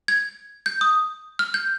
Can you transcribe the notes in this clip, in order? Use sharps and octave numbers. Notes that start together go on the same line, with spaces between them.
G#6
G6
D#6
F6
G6